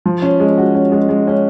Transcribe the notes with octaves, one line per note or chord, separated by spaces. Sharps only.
F3
C#4
G#3
F#4
C#4
G#3
G#3
C#4